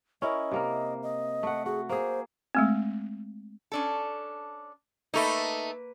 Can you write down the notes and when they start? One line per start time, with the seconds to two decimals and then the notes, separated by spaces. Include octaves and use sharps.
0.22 C#4 E4 A#4 D#5
0.51 C3 A#3 A#4
1.03 D#5
1.43 A3 F#5
1.66 F#4 G#4
1.89 A#3 G#4 C5
2.55 G#3 A3 C4
3.72 C#4 D4 A4
5.14 A3 A#3 D#4 B4